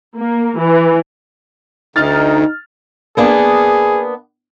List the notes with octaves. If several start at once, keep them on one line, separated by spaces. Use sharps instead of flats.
A#3
E3
D2 D#4 F6 A6
A#3 B3 D4 G#4